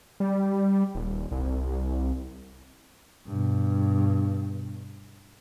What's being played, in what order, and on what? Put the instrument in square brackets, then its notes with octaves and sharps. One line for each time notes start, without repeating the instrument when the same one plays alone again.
[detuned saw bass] G3
D#1
C2
[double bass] G2 B2